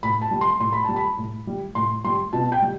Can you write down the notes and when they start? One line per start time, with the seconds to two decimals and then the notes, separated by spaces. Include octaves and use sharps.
0.03 A2 B5
0.22 A5
0.31 G3
0.41 C6
0.60 A2 C6
0.73 B5
0.84 G3 A5
0.96 B5
1.18 A2
1.47 G3
1.75 A2 C6
2.05 G3 C6
2.33 B2 A5
2.52 G5
2.62 G3